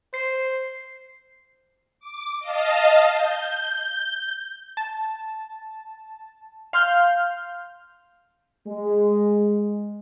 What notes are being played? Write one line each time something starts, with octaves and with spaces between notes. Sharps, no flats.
C5 C7
D6
D#5 F5 A5
G6
A5
F5 C6 F6 G6
G#3